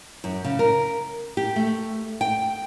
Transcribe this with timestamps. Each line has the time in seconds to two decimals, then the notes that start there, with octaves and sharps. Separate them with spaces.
0.24 F#2
0.44 C#3
0.59 A#4
1.37 G4
1.56 A3
2.21 G5